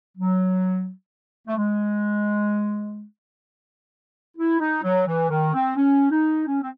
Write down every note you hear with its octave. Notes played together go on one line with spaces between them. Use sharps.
F#3
A3
G#3
E4
D#4
F#3
E3
D#3
C4
C#4
D#4
C#4
C4